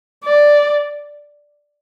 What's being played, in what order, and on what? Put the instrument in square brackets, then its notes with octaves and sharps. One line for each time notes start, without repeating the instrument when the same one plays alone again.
[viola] D5